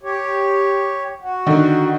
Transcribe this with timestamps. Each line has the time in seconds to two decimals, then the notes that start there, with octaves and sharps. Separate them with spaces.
0.03 G4 C#5
1.21 F#4
1.46 D3 D#3